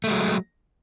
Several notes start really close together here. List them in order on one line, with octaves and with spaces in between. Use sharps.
A3 G#3 F#3